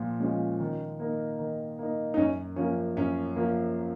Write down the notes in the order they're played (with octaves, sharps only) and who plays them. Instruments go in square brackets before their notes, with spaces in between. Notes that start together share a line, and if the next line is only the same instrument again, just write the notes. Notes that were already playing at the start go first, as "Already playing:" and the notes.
Already playing: [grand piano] A#2 F3
[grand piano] F3 G#3 [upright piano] C#4
[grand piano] D#3
A#3 D#4
D#3
A#3 D#4
[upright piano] D#4
[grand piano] F#2 [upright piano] C#4
[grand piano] F3 A#3 [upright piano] C#4
[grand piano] F#2 [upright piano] C#4
[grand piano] F3 A#3